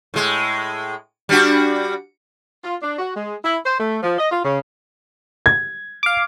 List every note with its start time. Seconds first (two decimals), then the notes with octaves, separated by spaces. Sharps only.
0.14 A2 G#3
1.29 G3 D4 F#4
2.64 F4
2.81 D4
2.98 F#4
3.16 G#3
3.43 E4
3.66 C5
3.79 A3
4.02 F3
4.19 D#5
4.31 F4
4.45 C#3
5.46 G#6
6.03 F5 D6